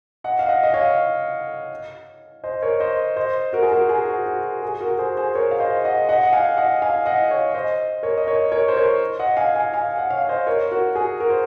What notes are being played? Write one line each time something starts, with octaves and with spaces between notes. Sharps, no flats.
D#5 F#5
F5
D#5 F#5
D#5
C#5 F5
C5 D#5
A#4 C#5
C5 D#5
C5 D#5
F#4 A#4
G#4
F#4 A#4
G#4
F#4
F#4
G#4
F#4 A#4
G#4 C5
G#4 C5
A#4 C#5
F5
C5 D#5
D#5 F#5
D#5 F#5
F#5
F5 G#5
D#5 F#5
F5 G#5
D#5 F#5
C#5 F5
C5 D#5
A#4 C#5
D#5
A#4 C#5
A#4 C#5
C5
A#4 C#5
D#5 F#5
F5 G#5
F5 G#5
F5 G#5
F#5
C#5 F5
F5
C5 D#5
A#4 C#5
F#4 A#4
G#4
F#4 A#4
C5